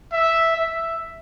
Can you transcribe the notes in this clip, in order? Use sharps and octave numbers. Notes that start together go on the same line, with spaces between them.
E5
E5